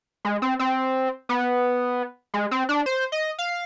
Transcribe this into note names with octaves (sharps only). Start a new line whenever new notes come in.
G#3
C4
C4
B3
G#3
C4
D4
C5
D#5
F5